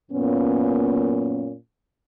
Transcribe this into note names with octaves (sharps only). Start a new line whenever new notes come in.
F#2 A#2 A#3 B3 C#4